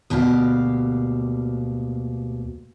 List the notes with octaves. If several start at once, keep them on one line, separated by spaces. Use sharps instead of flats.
D2 B2 A#3 G4 F5